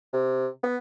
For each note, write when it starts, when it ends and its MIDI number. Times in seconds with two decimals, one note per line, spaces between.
0.13 0.47 48
0.63 0.77 59